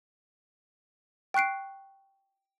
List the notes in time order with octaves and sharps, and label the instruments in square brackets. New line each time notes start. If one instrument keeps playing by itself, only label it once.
[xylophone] G5 C#6 F#6 C7 D7